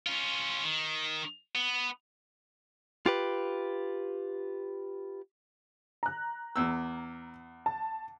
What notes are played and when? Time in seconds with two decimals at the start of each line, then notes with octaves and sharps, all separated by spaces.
0.06 C#4 F4
0.64 D#3
1.55 B3
3.06 F4 G4 B4
6.03 A#5 F#6
6.56 E2 E6
7.66 A5